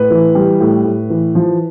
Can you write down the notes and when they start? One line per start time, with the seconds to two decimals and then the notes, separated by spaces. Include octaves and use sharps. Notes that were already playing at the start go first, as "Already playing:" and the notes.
Already playing: A2 B4
0.10 E3
0.35 G3
0.60 A2
0.85 A2
1.10 E3
1.35 F3